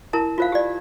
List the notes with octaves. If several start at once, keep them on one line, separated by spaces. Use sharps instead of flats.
E4 A#4 A5
F4 C5 F5
G4 D5